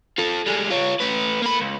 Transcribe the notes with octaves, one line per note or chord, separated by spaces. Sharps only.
F4 A4
G3 G#3
F4 C#5
A3 B4
A#3 B5
C#2